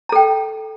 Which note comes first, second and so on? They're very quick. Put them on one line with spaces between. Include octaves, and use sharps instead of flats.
A#5 A4 G5